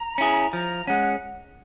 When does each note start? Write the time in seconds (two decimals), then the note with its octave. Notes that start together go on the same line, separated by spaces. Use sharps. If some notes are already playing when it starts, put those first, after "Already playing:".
Already playing: A#5
0.18 C#4 E4 G#4
0.53 F3 A#5
0.87 G#3 C#4 F#5